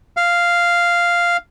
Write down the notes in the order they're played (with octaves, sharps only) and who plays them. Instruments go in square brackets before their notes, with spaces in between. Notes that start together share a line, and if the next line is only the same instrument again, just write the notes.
[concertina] F5